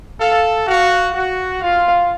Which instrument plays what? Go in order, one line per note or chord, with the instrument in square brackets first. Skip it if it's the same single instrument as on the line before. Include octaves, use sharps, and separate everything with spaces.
[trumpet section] A4 [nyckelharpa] F5
[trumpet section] F#4 [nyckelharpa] F5
[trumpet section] F#4
[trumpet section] F4 [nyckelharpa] F5